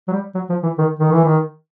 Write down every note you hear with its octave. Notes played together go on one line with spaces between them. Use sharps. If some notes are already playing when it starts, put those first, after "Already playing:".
F#3
G3
F#3
F3
E3
D#3
D#3
E3
D#3